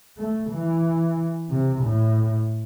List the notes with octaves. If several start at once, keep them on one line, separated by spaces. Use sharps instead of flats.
A3
E3
C3
A2